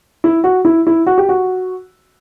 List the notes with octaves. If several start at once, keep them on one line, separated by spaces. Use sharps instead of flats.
E4
F#4
E4
E4
F#4
G4
F#4